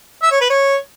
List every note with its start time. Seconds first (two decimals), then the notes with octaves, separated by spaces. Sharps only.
0.22 E5
0.31 C#5
0.41 B4
0.50 C#5